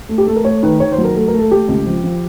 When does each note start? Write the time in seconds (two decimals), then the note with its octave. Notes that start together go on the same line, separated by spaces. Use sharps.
0.09 A3
0.18 G4
0.27 A3 A4
0.36 A#4
0.45 A3 C#5
0.63 D#3 B4
0.80 D#3 C#5
0.92 C5
0.98 F#3
1.04 A#4
1.16 A3 A4
1.28 A#4
1.34 A3
1.39 A4
1.51 A3 G4
1.69 C#2
1.86 F3
2.04 F3